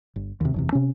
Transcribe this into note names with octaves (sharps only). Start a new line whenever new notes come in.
G1
D#2 C3
F#1 E2 C3
C3 C#4